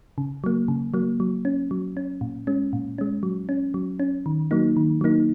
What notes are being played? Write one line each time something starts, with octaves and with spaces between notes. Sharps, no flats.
C#3
F#3 A#3
C#3
F#3 A#3
F#3
C#4
F#3
C#4
A#2
G#3 C#4
A#2
G#3 C#4
F#3
C#4
F#3
C#4
D#3
F#3 A#3 D#4
D#3
F#3 A#3 D#4